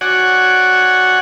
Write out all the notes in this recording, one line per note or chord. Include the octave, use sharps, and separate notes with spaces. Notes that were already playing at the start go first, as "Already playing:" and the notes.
F#4 C#5 D5 F#5 G#5